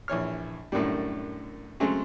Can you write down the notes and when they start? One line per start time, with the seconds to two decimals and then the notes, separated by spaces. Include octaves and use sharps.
0.08 A#1 E3 C#5 F6
0.72 F#2 A2 D3 D#3 G3
1.80 C#3 F#3 G#3 A3 C4 C#4